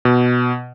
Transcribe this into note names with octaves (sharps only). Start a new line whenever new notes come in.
B2